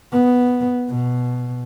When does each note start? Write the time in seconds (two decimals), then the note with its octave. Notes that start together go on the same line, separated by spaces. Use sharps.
0.12 B3
0.89 B2